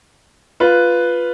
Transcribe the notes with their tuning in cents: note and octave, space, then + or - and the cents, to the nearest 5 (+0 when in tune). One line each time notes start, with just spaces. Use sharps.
F4 +0 B4 +0